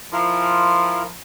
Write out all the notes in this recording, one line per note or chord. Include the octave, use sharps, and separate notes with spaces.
F3 E4 F4 A#4